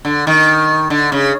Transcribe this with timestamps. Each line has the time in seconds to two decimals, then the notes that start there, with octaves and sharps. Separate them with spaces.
0.05 D3
0.27 D#3
0.90 D3
1.12 C#3